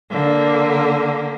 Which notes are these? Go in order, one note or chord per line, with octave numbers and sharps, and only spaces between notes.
D3 A#3